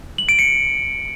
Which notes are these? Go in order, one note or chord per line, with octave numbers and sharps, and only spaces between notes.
F#7
D7
C#7